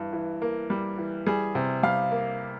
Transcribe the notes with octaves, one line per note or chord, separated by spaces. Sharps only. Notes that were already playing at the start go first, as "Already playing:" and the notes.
Already playing: G2 E3
E3
A#3
G3
E3
G3 G#4
C3
G3 F5
A#3